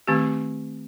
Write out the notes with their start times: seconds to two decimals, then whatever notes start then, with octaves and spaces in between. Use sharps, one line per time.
0.07 D#3 A3 C4 G4